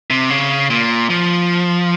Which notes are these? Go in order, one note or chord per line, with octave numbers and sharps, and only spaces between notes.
C3
C#3
A#2
F3